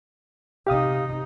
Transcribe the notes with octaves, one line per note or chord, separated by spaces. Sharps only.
C3 D#4 G4 F5 D#6